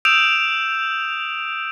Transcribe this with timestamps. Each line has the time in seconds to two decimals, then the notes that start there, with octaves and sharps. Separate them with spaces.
0.05 D#6 E6 G6 D7 E7 F7